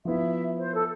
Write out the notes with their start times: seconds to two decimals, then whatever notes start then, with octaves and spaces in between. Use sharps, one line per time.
0.05 F3 B3 E4 E5
0.58 C5
0.75 A4